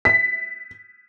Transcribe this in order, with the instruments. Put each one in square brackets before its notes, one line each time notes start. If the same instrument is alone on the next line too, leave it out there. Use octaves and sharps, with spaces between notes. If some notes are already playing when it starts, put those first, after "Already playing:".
[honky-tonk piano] B6